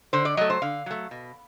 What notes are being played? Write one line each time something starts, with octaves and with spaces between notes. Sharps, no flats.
D3 C5
D5
F#3 A3 D#5
C5
D3 F5
F#3 A3
B2